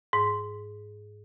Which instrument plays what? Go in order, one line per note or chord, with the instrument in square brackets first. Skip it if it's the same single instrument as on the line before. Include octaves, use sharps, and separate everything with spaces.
[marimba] G#2